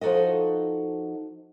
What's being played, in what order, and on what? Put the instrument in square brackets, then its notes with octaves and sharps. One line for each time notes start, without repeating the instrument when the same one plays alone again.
[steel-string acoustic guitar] F3 D#4 F#4 A4 D#5